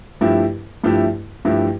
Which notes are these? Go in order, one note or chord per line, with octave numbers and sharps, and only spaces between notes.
G2 F3 A3 E4 G4
G2 F3 A3 E4 G4
G2 F3 A3 E4 G4